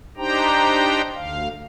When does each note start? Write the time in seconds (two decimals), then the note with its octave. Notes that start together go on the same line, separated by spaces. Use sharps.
0.17 D4 D#4 G4 C5 G5 A#5
1.15 D2 F5